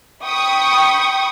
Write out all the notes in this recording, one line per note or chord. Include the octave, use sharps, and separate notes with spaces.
G5 B5 C#6 D#6